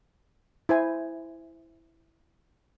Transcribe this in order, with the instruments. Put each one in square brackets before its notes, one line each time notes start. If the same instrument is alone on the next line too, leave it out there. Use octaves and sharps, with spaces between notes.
[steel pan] E4 C5 G#5